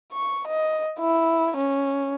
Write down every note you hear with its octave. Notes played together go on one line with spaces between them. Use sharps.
C#6
D#5
E4
C#4